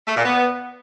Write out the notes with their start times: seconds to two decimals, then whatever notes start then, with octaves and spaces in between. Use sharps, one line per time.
0.08 A3
0.17 A#2
0.26 B3